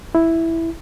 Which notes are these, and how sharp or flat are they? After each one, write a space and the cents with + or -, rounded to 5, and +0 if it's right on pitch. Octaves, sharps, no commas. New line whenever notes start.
E4 +0